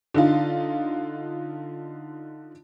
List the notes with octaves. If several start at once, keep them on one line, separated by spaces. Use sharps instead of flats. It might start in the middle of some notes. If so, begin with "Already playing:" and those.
D3 D#4 F4